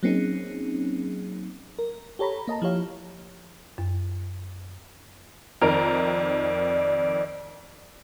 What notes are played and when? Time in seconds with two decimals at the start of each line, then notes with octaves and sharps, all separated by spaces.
0.03 F#3 A#3 C4 C#4 D#4 G#4
1.79 A#4
2.19 G4 A4 C#5 A#5 B5
2.47 A#3 D#5 A5 A#5
2.62 F3 E4 G4 C#5 F5
3.78 F#2
5.61 F2 D#3 A#4 D5 D7